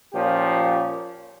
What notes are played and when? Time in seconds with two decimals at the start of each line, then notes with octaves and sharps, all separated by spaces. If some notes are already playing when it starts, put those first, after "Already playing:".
0.13 A#2 F3 C#4 G4